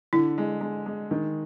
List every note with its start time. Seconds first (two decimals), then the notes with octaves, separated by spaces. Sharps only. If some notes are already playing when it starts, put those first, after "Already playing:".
0.13 D3 E4
0.38 G#3
0.61 G#3
0.86 G#3
1.11 D#3